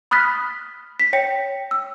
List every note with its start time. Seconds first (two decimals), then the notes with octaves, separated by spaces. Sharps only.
0.11 B5 D#6 F6 F#6 A6 B6
1.00 B6
1.13 C#5 G5 A#6 C#7
1.71 E6